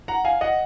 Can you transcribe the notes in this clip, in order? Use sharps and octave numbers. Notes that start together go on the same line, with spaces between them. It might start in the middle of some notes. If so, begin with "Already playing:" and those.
F#5 A#5
F5 G#5
D#5 F#5